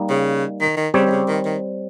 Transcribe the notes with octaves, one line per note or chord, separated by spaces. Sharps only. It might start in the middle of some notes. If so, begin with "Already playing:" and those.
Already playing: G3 A#3 D#4
C#3
D#3
D#3
C#3 G3 C4 G4 C#5
D#3
C#3
D#3
D#3